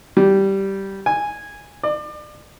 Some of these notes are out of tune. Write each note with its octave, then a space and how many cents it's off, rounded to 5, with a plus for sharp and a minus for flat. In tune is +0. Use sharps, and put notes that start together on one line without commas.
G3 -10
G#5 -10
D5 +35